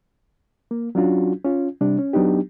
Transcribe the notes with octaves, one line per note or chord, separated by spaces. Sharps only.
A#3
F#3 C#4 D4 F4 F#4
C#4 F4
C3 G3 D4
C#4
F#3 B3 D4 D#4 G4